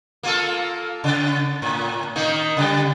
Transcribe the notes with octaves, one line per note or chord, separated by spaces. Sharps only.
A#3 F4 A4
C#3
A2
D#3 A#3 D#4
C#3 G3